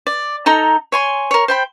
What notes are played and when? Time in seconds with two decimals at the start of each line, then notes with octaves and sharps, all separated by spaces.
0.07 D5
0.46 D#4 A4 A#5
0.92 C#5 G#5 C6
1.31 A#4 C#5
1.48 C5 G5 B5